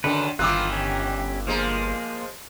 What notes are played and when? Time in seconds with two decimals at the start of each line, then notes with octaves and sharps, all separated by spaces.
0.04 F#2 D3 D#3 D4 B4
0.39 G1 D#3 E3 A#3 F4 D6 E6 F#6
0.73 C#4 G4
1.47 F3 G#3 A#3 A#4